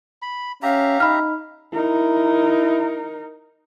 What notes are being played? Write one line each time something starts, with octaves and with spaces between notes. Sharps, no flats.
B5
C#4 G4 E5 F5 A#5
D#4 B5 F6
D#4 E4 A#4